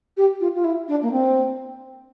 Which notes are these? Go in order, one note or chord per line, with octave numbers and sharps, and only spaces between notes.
G4
F4
F4
E4
D4
A#3
C4